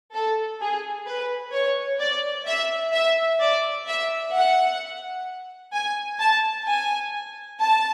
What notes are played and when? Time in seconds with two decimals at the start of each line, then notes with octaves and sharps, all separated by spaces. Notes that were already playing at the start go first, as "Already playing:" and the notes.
0.13 A4
0.60 G#4
1.06 B4
1.53 C#5
2.00 D5
2.46 E5
2.93 E5
3.40 D5
3.86 E5
4.33 F#5
5.73 G#5
6.19 A5
6.66 G#5
7.60 A5